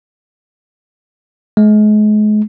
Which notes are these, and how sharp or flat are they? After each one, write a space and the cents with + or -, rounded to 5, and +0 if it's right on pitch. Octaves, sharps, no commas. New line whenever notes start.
G#3 +35